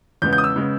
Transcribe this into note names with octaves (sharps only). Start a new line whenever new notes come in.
E2 C#3 G#3 B3 G6
G6
D#6
E6
C#3 G#3 B3